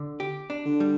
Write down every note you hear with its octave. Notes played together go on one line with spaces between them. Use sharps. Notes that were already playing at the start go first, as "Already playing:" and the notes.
Already playing: D3
G4
D4
D3
G3